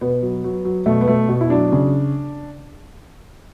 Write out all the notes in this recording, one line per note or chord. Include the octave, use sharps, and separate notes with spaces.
B2 B3
F#3
F#3
F#3
B2 A3
B3
B2 A3
B2
E4
F#3 D4
C#3